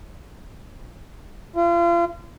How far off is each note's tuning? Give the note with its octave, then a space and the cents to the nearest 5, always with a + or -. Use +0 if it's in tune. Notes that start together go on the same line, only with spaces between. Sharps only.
F4 -35